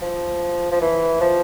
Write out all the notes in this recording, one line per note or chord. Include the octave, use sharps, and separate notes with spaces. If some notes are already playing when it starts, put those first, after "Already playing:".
F3
F3
E3
F3